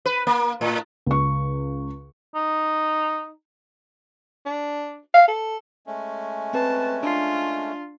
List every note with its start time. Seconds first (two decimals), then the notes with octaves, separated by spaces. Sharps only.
0.06 B4
0.27 A#3
0.61 A2
1.06 C#2 C#6
2.35 D#4
4.46 D4
5.14 F5
5.28 A4
5.87 G#3 A3 C#4
6.53 C4 B4 A5
7.03 D4 F4 C7